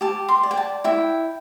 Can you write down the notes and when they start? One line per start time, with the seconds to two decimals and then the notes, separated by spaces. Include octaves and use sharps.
0.01 G4 A5
0.28 C6
0.43 D5
0.51 G5
0.57 A5
0.84 E4 G5